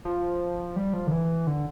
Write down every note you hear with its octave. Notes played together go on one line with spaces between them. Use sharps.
F3
G3
F3
D3
E3
D3